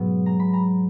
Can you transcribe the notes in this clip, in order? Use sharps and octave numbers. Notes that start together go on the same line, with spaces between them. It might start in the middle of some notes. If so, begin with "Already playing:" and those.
Already playing: G#2 B2 F#3 B3
A#5
B5
A#5